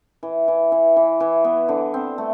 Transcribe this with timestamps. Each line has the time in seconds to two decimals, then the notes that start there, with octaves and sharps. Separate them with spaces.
0.23 E3
0.48 E3
0.72 E3
0.97 E3
1.20 E3
1.44 B3
1.69 D3
1.94 C4
2.18 A3